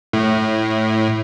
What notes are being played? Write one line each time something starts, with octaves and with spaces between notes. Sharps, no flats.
A2